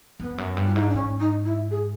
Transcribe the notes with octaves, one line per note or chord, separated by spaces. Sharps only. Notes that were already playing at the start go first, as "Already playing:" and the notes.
F2 B3
F#2
G2
F4
G#2 E4
D#4
D4
G#2 C#4
D#4
E4
G#4